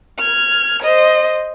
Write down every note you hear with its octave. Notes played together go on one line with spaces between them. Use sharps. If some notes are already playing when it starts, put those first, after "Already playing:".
F6 G#6
C5 D#5